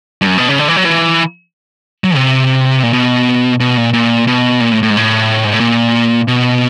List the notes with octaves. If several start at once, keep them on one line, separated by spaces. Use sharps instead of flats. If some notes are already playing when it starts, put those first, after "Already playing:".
G2
F#2
B2
C#3
D3
E3
F#3
E3
F#3
C3
A#2
B2
B2
A#2
A#2
B2
A#2
A2
A2
G#2
A2
G#2
A2
A#2
B2